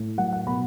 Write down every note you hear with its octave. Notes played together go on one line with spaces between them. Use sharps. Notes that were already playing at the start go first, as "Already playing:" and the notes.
Already playing: A2
F#3 F#5
F#5
B2 B5